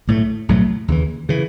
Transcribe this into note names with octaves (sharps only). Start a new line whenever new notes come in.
B1 A2 F#3 A3
B1 A2 F#3 A3
D#2 C#3 E3
C#3 E3